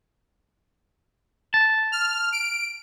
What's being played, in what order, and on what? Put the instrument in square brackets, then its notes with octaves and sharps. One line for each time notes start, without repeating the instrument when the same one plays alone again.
[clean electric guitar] A5
[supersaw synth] F6
D7